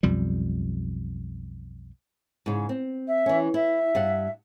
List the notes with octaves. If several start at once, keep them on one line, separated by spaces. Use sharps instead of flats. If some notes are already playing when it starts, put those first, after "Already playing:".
B1 F2 G3
G#2 C#3
C4
E5
E3 C#4
E4 E5
G2 F5 F#5